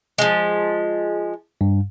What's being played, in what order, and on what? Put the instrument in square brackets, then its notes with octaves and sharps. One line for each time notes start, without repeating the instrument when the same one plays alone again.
[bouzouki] F3 G#3
[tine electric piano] G2